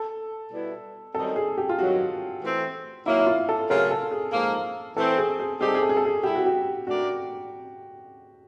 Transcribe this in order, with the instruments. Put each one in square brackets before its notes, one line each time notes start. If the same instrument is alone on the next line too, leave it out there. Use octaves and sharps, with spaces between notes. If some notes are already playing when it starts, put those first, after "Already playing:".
Already playing: [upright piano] A4
[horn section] B2 G3 B3 E4
[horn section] F#2 D#3 G3 C4 D#4 [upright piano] A4
[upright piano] G#4
G4
F4
[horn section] G2 D#3 F#3 [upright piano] F#4
[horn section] E3 A3 C4
[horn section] D#3 F#3 A#3 [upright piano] E4
[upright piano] E4
F4
A4
[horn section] C#3 F#3 A3 C#4 F4 [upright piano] A#4
[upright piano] A4
G#4
[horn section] G#2 F3 A#3
[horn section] E3 A3 C4 [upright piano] A4
[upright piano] G#4
G#4
[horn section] G3 C4 D#4 G4 [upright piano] G#4
[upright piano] A4
G#4
A4
G#4
A4
G#4
[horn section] G3 C4 E4 [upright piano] G4
[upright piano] F#4
G4
[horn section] A3 D4 G4 A#4 D5 [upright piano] F#4